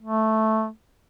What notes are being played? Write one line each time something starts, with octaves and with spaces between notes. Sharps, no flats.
A3